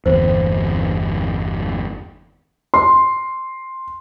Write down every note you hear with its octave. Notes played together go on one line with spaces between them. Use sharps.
G1 E2 C5
C6